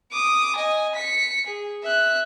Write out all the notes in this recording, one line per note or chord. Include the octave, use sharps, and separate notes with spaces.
D6 D#6
D#5 G#5
B6 C#7
G#4
E5 F#6